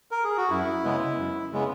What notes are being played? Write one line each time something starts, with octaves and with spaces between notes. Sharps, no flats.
A#4
G#4
F#4
F#2 E4
C#3 G#3 B3
F#2
C#3 G#3 B3